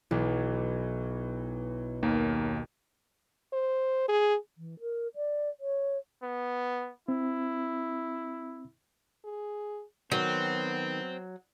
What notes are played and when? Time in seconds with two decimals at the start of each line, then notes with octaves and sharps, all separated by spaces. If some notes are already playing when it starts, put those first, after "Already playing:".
0.11 B1 E3
2.03 D#2 D#3 A#3
3.53 C5
4.08 G#4
4.58 E3
4.80 A#4
5.16 D5
5.60 C#5
6.23 B3
7.08 C4 E4
9.25 G#4
10.12 D#3 F#3 B3 C4